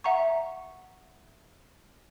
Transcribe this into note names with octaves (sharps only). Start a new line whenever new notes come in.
E5 F#5 A#5 C#6